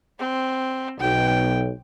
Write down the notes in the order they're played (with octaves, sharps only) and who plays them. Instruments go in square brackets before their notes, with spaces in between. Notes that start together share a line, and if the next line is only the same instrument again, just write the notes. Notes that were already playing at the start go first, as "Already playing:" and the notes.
[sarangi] C4
[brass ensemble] B1 [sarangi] G5